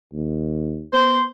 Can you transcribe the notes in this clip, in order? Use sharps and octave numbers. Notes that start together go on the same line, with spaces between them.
D#2
B3 C5